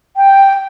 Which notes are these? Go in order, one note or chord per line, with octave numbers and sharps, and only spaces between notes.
G5